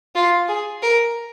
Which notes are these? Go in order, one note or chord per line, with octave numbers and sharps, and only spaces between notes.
F4
G#4
A#4